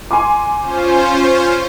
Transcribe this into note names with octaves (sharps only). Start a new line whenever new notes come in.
G#5 C6 D6
C#4 F4 C5